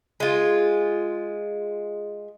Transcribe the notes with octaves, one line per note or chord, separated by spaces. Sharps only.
G#3 F4